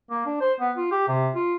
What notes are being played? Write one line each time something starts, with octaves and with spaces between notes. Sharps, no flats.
A#3
D4
C5
B3
F4
G4
C3
F4